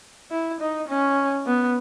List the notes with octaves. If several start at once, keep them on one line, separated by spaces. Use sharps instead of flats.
E4
D#4
C#4
B3